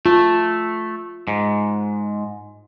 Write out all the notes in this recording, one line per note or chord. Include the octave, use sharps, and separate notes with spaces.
A3 F4
G#2